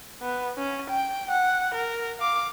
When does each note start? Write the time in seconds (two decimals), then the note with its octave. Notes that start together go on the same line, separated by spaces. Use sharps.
0.22 B3
0.58 C#4
0.90 G5
1.31 F#5
1.74 A#4
2.19 F5 D6